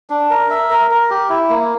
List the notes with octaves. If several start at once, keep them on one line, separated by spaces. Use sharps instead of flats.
D4
A#4
E5
A#4
A#4
G4
E4
A#3